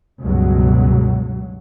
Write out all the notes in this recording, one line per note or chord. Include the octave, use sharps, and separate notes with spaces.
C#2 G2 B2 F#3